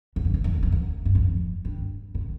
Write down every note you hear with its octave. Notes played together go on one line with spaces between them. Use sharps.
E2
F2
E2
F2
E2
F2
E2
G2
F2
G2
A2